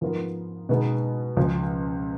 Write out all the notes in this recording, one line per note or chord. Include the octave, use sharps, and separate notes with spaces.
G#2 F3 B3 F4 A#4
B2 G#3 B3 D#4
C#2 C#3 F3